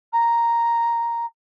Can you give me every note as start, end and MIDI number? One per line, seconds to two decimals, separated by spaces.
0.13 1.26 82